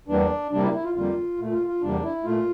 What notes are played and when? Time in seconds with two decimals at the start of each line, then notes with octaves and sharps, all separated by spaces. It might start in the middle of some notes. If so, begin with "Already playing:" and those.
0.08 E2 E3 G3 A#3 D4
0.51 C3 G3 A#3 D4
0.63 E4
0.73 E4
0.84 F4
0.95 F2 D3 G3 A#3 F4
1.38 A#2 A3
1.52 F4
1.67 F4
1.81 E2 C3 G3 A#3 D4
2.03 E4
2.24 A#2 A3 F4